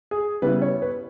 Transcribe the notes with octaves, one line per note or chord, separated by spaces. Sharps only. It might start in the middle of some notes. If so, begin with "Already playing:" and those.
G#4
C#3 G3 B3 E4 B4
C#5
B4